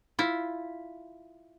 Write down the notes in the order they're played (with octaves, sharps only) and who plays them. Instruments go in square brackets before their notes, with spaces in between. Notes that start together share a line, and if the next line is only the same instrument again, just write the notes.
[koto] E4 F4